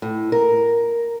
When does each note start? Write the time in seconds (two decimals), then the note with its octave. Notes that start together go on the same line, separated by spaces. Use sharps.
0.02 A2
0.32 A#4